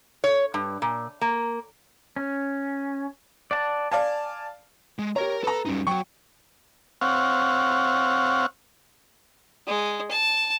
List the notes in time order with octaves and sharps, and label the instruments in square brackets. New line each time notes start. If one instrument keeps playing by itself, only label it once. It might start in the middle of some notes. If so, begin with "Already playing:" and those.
[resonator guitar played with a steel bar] C#5
G2
A#2
A#3
[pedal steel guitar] C#4
D5 F#5 A5
[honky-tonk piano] D5 F5 A5 [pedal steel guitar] G#5
[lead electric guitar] G#3
[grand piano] G4 C#5 [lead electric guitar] A#4 A#5
[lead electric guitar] A4 [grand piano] B4 A#5
[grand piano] F#2 [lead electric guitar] G3 D#4
[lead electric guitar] F#3 F#4 [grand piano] G5 C#6
[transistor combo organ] C4 C#5 F5 F#5
[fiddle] G#3
A5